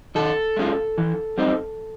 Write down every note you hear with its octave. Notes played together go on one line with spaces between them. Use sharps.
D#3 A4
G#3 C#4 F4
E3
G3 C4 D#4